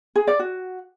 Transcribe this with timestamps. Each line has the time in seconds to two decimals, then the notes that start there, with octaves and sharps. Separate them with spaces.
0.16 G#4
0.27 D5
0.39 F#4